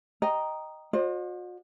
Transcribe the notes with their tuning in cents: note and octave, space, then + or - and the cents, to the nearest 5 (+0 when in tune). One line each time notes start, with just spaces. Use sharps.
D#5 -5 G5 +0 A#5 +5
F#4 -45 C5 +30 D#5 -45